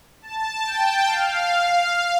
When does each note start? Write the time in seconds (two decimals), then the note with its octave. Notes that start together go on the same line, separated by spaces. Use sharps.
0.21 A5
0.65 G5
1.07 F5
1.50 F5